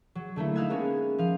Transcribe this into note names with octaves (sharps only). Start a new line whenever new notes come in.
F#3
D3 A3 A#3 E4
D#4 F5 E6 F#6 G#6 E7
G#3 A#3 B3 C#4
F3 F5